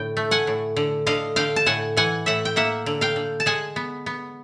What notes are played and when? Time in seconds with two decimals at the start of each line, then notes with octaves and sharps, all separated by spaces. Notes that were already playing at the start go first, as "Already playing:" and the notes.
Already playing: A2 D3 G5
0.17 A3
0.31 F#5 G#5
0.47 A2
0.76 D3
1.06 D3 D#5 F5
1.36 D3 F5 G5
1.56 A5
1.66 A2 F#5 G#5
1.97 E3 F#5 G#5
2.26 A2 E5 F#5
2.45 G5
2.56 A#3 E5 F#5
2.86 D3
3.01 F5 G5
3.16 D3
3.40 A5
3.46 G#3 F#5 G#5
3.76 B3
4.06 B3